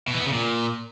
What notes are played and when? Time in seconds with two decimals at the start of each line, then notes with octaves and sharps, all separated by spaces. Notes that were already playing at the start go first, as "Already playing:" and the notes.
0.08 B2
0.14 E3
0.20 B3
0.27 C#3
0.33 A#2